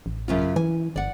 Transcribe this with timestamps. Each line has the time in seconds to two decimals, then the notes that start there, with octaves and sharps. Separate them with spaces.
0.06 A1
0.28 F#2 C#3 F4
0.56 E3 G#5
0.96 G1 D5 F#5